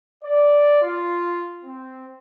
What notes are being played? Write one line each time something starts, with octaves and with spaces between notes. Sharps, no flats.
D5
F4
C4